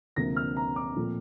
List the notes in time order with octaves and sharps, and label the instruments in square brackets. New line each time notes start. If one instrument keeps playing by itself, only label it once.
[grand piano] D2 C3 F3 A#3 A#6
F6
A#5
D6
A#2 F3 A3 C4